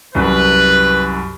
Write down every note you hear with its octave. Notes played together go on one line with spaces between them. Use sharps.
C2 F#2 B4